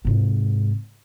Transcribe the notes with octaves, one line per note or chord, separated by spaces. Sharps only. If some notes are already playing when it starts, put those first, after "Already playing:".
G#2 C3